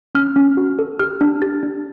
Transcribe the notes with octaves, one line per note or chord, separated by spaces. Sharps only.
C#4 F6
C#4
F#4
A4
G4 F6
D4
G4 A6
D4